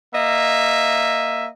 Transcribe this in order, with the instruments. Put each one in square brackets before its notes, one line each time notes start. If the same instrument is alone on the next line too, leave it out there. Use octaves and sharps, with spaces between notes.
[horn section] A#3 D#5 E5